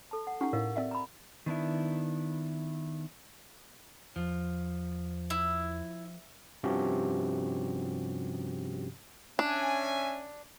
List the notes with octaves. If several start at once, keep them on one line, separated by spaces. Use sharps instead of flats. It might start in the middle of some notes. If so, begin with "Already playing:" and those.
A4 A5
F#5
C#4 D#4 G4 F#5
A2 A#4 D#5 F5
C4 D5 E5
A#5 B5
D#3 B3 D4 E4
E2 F3
E4
G2 C3 F3 C#4 F#4 G4
C#4 D4 E5 G#5